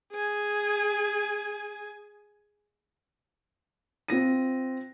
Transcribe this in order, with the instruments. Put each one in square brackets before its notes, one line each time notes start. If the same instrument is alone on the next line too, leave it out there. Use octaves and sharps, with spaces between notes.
[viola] G#4 G#5
[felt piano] C4 F4 A#6 D#7